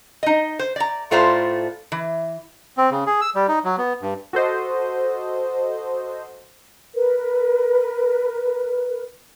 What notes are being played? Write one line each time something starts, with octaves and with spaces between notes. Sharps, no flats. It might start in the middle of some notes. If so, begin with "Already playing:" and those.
D#4 D#5
C5
D5 A#5
A2 A3 F4 C5 D5 A#5
E3
C4
C#3
G#4
E6
G3
D#4
F#3
B3
G2
F#4 A4 C5 D#5
A#4 B4